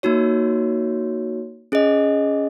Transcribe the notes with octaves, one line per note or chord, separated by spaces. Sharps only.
A#3 D#4 F#4 C#5
C#4 G#4 D#5